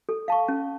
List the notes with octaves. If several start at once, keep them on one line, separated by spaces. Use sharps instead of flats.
A4
F5 A5 C#6
C#4